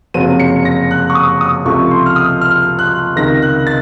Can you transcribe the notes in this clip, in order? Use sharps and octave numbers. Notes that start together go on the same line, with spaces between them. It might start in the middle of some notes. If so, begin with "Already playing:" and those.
F#1 F2 C3 F#3 D#7
C#7
A#6
F#6
C#6
D#6
D#6
C#2 C3 F3 A3 C#6
C6
F6
D#6
F6
F#6
C#2 C3 D#3 A#6
F#6
A6